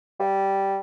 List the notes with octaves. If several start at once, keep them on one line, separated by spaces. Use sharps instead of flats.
G3